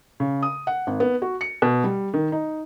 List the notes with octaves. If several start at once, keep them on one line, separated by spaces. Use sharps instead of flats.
C#3
D#6
F#5
G#1
B3
F#4
C#7
B2
G3
D#3
D#4